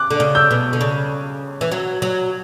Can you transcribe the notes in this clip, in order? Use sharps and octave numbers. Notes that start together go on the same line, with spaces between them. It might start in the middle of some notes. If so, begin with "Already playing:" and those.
Already playing: D6 F#6
D3
C#3
E6 G6
B2
D3
C#3
E3
F#3
F#3